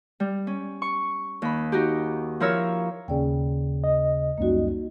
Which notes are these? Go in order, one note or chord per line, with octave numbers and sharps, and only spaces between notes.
G3
C#4
C#6
D#2 B5
D#4 F#4 G4
F3 E4 A#4 C#5 E6
D#2 C#3 D5 G5
D#5
C#2 F#2 G3 A#3 D#4 F#4